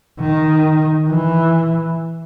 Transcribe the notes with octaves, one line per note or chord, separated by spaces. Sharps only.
D#3
E3